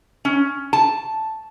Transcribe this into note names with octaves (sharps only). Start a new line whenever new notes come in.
C#4
A5